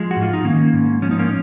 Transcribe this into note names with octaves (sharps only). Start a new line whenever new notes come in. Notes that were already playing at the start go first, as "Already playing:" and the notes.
Already playing: F3 G#3
F#4
G#2
F4
D#4
D#3 A#3 C#4
G#2
F3 C#4
D#4
A#3 C#4